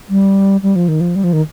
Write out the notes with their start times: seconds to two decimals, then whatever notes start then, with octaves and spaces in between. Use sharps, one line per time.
0.09 G3
0.63 G3
0.76 F3
0.88 D#3
1.01 F3
1.16 G3
1.24 F3
1.33 D#3